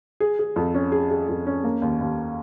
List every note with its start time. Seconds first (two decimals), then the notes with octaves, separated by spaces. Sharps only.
0.20 G#4
0.39 G#4
0.56 F2
0.75 C#4
0.92 G#4
1.11 G#4
1.29 F2
1.47 C#4
1.64 A#3
1.82 D#2
2.01 D#2